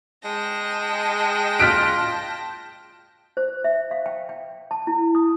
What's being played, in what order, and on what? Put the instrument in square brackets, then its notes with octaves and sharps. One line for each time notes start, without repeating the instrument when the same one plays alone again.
[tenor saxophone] G#3 [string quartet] G5 A5 A#6
[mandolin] F4 F#6 [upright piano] F6 B6 D7
[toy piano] C5
E5
F5
G5
G5
A5
E4
D#6